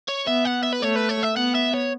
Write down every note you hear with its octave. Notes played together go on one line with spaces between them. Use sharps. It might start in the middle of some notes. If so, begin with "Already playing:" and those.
C#5
B3 E5
F#5
E5
B4
A3 C#5
B4
C#5
E5
B3 F#5
E5
C#5